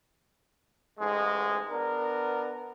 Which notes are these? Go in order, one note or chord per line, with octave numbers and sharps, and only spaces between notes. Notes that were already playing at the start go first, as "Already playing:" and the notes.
A1 G#2 G#3
B3 D4 A#4